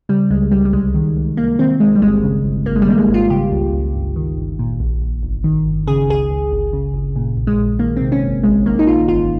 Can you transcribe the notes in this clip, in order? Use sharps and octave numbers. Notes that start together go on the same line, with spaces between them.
C#3 G3
C#2 G#3
C#2 G3
G3
C2 G#3
D#3
C2
C2 A#3
D#3 C4
C2 G#3
G3
G1 G#3
C#3
G1
G#1 A#3
G#3
G3
D#3 A#3
G#3
G#1
F4
C#3 G4
C#2
C#2
G1
D#3
G1
A#2
A#1
A#1
G1
D#3
G1
C#3 G#4
C#2 G#4
C#2
G1
C#3
G1
A#2
A#1
G#3
A#1
D#3 A#3
C4
C3
C#4
G1
A#1 G#3
D#3 A#3
D#4
A#1 F4
G1 F4